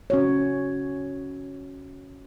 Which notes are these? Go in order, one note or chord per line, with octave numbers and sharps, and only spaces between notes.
C#4 F#4 C#5